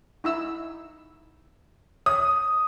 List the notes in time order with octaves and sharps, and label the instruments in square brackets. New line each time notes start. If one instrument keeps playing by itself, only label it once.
[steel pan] D#4 E4 E6
[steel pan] C#5 [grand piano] D#6